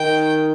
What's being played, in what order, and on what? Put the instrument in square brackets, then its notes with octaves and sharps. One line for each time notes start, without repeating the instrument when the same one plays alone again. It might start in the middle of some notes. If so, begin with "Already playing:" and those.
Already playing: [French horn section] D#3 [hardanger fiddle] G5